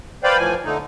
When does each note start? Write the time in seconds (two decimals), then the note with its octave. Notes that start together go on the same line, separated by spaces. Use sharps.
0.24 B4 C5 D5 F5 G5 B5
0.37 A2 E3 F3 G#5
0.65 D3 A3 D#4